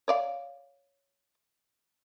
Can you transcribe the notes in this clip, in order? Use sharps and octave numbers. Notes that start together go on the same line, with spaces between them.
C#5 D5 F5